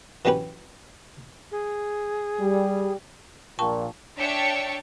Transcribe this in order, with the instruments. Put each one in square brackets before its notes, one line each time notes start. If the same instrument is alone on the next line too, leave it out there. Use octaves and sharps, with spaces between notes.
[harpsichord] E3 F#3 C#4 G4 B4
[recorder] G#4
[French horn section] G3
[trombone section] A#1 A#2 [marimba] G5 A5 C#6
[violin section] D4 C#5 E5 G5 A5 C#7